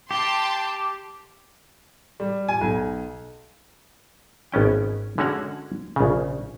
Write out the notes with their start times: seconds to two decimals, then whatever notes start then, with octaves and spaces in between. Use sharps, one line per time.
0.11 G4 G5 A5 C6
2.20 G3
2.48 G#5
2.61 B1
4.52 G#1 B3 C#4 G5
5.18 D3 G#3 C#4 F#4 C#5 F#5
5.96 A#1 C#3